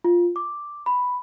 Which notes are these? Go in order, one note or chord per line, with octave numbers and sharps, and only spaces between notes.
F4
D6
B5